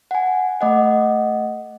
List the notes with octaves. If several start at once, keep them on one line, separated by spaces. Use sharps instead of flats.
F#5 G#5
A3 D#5 F#5